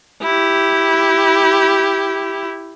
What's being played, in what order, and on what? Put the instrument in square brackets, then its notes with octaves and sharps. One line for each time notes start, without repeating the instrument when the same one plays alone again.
[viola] E4 G4